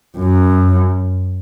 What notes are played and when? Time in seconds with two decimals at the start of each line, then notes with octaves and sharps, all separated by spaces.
0.18 F#2